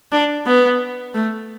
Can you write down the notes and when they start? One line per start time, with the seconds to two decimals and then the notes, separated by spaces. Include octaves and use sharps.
0.12 D4
0.47 B3
1.14 A3